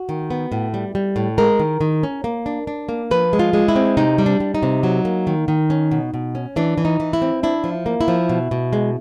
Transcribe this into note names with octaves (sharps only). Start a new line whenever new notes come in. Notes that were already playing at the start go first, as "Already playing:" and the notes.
Already playing: F#4
D#3
B3
A2
G3
G3
A2
G#3 A#4
D#3
D#3
C#4
A#3
D4
D4
A#3
F3 B4
G#3
F4
G#3
E4
C4
C3 D#4
G3
D4
G3
D#4
C3
F#3
A#3
D#3
D#3
C#4
B2
B2
C#4
E3 D4
E3
D#4
E3
E4
C4
D4 E4
F3
A#3
E4
F3
B2
B2
G#3